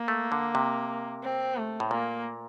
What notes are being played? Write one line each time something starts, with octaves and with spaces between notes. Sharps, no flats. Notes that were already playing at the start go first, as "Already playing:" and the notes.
Already playing: A#3
A3
D3
C3
C4
A3
A2
A#2 A#3